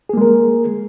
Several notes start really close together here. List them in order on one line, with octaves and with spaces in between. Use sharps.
G#4 A#3 G#3 A#4